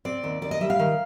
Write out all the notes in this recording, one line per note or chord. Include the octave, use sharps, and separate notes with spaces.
C4 D5
D#2
D#2 D5
D#5
G3 E5
F5
D#3